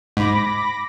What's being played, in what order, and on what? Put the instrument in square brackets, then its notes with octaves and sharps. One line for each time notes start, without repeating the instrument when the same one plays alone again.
[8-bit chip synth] G#2 [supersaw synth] B5 D6 A#6